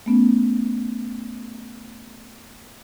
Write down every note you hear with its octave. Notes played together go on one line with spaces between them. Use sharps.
A3 B3 C#4